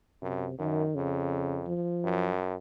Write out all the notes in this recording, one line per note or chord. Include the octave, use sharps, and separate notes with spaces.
F#2 C3
F#2 D#3
F2 C#3
F3
F#2